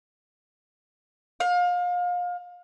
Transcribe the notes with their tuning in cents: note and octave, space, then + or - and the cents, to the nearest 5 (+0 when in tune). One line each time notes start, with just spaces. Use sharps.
F5 +30